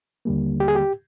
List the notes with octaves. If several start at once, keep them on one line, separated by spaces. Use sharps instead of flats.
D#2 D3 G3 A#3
G4
G#4
G4